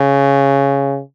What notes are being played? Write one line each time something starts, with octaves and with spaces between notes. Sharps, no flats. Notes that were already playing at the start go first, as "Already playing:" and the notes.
Already playing: C#3